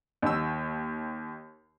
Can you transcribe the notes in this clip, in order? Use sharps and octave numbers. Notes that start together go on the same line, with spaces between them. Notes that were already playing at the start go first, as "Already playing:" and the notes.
D#2 E6